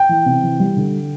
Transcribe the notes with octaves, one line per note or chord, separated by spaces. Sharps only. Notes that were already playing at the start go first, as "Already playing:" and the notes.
Already playing: G5
E3
C3
E3
G3
D3